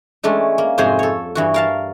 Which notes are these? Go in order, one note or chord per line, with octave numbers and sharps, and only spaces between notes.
E3 G#3 A3 C#4 D4
A#3
F2 G#2 C3 G#4 C5 C#5
A4 C#5
G2 E3 F#4
A#4 F5 A5